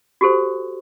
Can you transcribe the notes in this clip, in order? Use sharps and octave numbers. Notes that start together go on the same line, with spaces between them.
F#4 G4 A4 C5